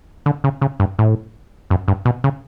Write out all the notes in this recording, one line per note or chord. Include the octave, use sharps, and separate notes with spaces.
D3
C#3
C#3
G2
A2
F#2
G2
B2
C#3